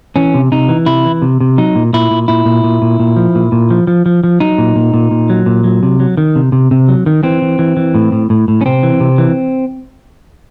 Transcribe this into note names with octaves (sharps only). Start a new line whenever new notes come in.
E3 C#4
C3
C3 D#4
E3
C3 E4
E3
C3
C3
F#3 D#4
A#2
A#2 E4
A#2
A#2 E4
A#2
A#2
A#2
A#2
F3
A#2
A#2
F3
F3
F3
F3
F#3 D#4
A#2
A#2
A#2
A#2
F#3
A#2
F#3
C3
F#3
D#3
C3
C3
C3
F#3
D#3
E3 C4
E3
E3
E3
A2
A2
A2
A2
C#4
C3 C4
E3
C3
E3